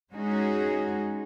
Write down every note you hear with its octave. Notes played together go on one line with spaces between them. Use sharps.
G#3 C#4 D#4 F#4 G#4